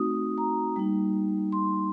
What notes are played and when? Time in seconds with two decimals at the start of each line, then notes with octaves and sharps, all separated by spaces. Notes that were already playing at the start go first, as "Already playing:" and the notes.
Already playing: A3 C4 D#4 F#4 D#6
0.38 A#5
0.76 G3 A#3 D#4
1.52 C6